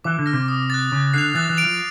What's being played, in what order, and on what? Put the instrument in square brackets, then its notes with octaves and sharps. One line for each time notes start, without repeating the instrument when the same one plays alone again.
[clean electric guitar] E3 [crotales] D6
[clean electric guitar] D3
[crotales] F6 A#6
[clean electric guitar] C3
[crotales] D#6
F#6 A6
[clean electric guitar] C#3 [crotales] A6
[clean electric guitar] D3 [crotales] C7 F7
[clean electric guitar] E3 [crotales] A6
[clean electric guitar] E3
[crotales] D7 F7
[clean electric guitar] F3